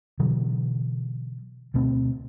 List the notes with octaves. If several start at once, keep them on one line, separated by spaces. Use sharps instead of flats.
B2 D3 E3 F#3
D2 B2 A3 C4